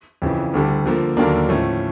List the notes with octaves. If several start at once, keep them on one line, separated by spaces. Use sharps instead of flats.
F2 C#3 E3
D2 D3 G3
D3 F3 A#3
D#2 D3 F#3 A#3 D4
A2 F3 A3 C#4